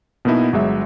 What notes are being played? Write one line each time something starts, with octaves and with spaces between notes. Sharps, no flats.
B2 A#3 B3 D#4 E4
G1 F#3 G#3 E5